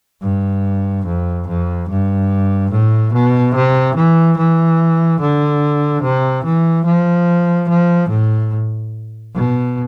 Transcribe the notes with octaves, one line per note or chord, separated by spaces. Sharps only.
G2
F2
F2
G2
A2
B2
C3
E3
E3
D3
C3
E3
F3
F3
A2
B2